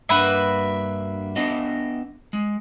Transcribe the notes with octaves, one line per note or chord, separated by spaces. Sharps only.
G2 A#3 D4 F#4 B4 E5
B3 D4 D#5
G#3